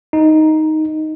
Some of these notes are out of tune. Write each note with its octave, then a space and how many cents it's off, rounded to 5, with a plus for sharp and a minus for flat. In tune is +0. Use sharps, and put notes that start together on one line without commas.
D#4 +5